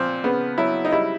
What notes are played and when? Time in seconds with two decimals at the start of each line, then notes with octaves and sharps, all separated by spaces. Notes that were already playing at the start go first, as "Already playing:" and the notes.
Already playing: A#2 F3 C4
0.24 C#3 B3
0.58 F#3 E4
0.85 D#4
0.92 G3 E4